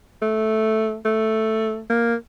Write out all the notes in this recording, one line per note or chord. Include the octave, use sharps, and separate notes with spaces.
A3
A3
A#3